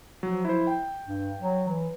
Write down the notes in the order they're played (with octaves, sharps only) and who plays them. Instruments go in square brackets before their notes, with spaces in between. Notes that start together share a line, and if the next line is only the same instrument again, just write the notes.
[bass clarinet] F3 [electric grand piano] F#3
[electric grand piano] E4 C5
G5
[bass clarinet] G2
F#3
E3